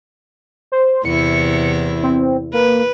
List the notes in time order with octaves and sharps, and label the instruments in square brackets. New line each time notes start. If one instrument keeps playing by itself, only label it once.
[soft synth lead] C5
[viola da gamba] E2 C3 E4 [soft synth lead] C#7
[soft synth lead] C4
[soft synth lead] A#3 [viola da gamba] B4